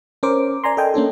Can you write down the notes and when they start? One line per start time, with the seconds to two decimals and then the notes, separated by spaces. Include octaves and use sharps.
0.23 C#4 A#4 C5 D6
0.64 D5 G#5 A#5 C6
0.77 A4 A#4 D#5 G5 G#5
0.94 A#3 C#4 D4 A4